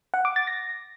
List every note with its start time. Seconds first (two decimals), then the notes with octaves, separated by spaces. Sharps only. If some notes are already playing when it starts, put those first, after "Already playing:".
0.14 F#5
0.25 D6
0.36 A6
0.47 A#6